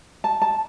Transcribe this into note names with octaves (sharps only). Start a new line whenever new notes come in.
A5
A5